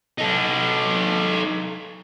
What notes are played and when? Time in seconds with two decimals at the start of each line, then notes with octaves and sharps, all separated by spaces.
0.18 D#4 A4